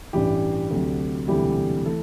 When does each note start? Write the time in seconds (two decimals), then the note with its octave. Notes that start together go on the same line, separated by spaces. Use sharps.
0.13 A1 G2 E3 G4
0.71 D2 C3 F#3
1.28 E1 D2 C3 E3 G3 G4
1.86 E3 A3 A4